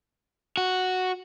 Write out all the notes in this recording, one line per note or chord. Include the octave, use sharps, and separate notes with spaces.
F#4